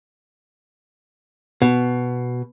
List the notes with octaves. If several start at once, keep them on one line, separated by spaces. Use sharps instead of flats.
B2